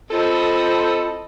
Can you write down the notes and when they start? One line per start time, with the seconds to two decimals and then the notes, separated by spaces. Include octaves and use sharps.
0.10 C4 F4 A4 D#5 B5